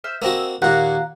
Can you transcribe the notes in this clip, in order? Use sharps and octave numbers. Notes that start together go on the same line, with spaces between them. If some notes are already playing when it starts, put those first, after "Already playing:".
C5 E5 F6
A#3 C4 F#4 D#5 A5 E6
D#2 A#2 F5 F#5 A#5